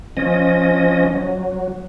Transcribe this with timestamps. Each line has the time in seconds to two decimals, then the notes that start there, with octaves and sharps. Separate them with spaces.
0.17 F3 C#4 D#5
1.14 F#3